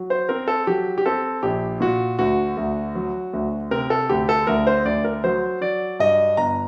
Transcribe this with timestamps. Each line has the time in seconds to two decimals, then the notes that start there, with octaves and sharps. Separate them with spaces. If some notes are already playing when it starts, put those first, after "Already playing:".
Already playing: F#3
0.10 C5
0.29 C4 A#4
0.48 A4
0.67 F#3 G4
0.98 G4
1.06 C4 A4
1.43 A#1 G4
1.81 A#2 F#4
2.19 D2 F#4
2.57 D2
2.95 F#3
3.33 D2
3.71 C3 A#4
3.90 A4
4.09 D2 G4
4.29 A4
4.47 D2 A#4
4.67 C5
4.85 D2 D5
5.05 A#4
5.24 F#3 C5
5.61 F#3 D5
5.99 G2 D#5
6.37 G1 A#5